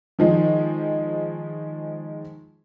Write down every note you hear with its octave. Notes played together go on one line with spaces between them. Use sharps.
D#3 F3 G#3